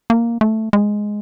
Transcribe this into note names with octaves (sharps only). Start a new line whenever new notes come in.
A#3
A3
G#3